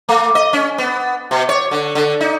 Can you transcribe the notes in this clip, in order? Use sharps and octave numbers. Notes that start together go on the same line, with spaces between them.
A3
D#5
C#4
B3
B2
C#5
D3
D3
D#4